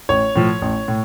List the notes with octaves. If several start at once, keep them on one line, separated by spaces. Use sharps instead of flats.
A1 C#5
A2 F3
A1
A2